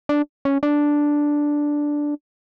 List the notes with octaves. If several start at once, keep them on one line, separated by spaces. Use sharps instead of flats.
D4
C#4
D4